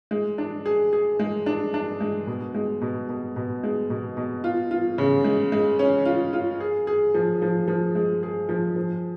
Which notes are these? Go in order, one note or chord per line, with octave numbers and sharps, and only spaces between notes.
G#3
D4
G#4
G#4
G#3
D4
D4
G#3
B2
G#3
B2
B2
B2
G#3
B2
B2
F4
F4
C#3
G#3
G#3
C#4
F4
F4
G#4
G#4
F3
F3
F3
G#3
G#4
F3
F3